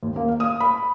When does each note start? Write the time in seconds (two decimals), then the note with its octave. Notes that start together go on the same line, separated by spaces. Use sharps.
0.03 D#2
0.16 A#3
0.28 F5
0.40 D#6
0.60 B5